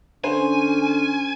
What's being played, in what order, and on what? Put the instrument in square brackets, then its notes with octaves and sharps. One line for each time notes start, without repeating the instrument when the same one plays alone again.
[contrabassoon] D3 [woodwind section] C#4 [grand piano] C5 [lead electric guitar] G#5